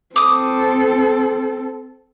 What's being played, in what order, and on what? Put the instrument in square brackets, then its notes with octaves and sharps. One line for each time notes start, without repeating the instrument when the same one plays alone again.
[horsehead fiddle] C4 A4 [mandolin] D6 D#6